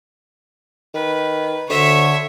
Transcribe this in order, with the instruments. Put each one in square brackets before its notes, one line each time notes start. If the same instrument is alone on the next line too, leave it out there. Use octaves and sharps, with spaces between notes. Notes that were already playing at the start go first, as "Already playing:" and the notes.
[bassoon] D#3 [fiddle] B4
[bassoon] D2 [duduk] D3 [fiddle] C#5 E5